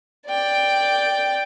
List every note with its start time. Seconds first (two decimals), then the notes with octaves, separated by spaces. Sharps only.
0.27 D5 G5